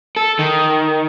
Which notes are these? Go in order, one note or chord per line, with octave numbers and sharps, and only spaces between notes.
A4
D#3